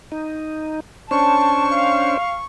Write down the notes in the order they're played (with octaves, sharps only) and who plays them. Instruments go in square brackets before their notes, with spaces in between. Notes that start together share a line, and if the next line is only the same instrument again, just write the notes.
[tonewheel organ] D#4
[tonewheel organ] C#4 D4 C5 [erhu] A5 [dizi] C#6
[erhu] F5